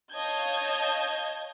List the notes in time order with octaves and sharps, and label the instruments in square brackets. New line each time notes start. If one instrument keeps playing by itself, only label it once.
[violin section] C#5 D#5 F5 A5 G6 G#6